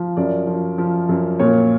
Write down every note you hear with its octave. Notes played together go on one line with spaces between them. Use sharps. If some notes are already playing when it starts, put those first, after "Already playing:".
Already playing: F3
F#2 D5
F3
F3
F#2
A#2 C#5